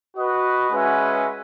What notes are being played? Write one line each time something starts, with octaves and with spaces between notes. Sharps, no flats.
F#4 B4 D#5
G#3 C#4 F#4 B4 E5